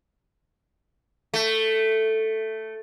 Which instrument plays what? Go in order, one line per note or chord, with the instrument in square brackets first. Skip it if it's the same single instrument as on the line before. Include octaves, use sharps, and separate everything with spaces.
[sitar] A3